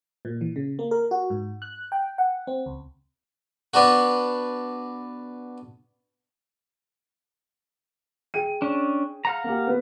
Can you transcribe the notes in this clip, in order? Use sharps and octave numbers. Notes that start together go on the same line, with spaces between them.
A#2
E3
C#3
A#3
A#4
F#4
G#2
F#6
G5
F#5
C4
C#2
B3 D4 F#4
G#4 G5 D#7
C#4 D4
F5 F#5 A#5
A#3 G4
B3 B4